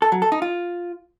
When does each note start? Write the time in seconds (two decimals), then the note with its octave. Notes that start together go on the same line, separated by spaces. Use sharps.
0.02 A4
0.12 F#3
0.22 A4
0.32 D#4
0.42 F4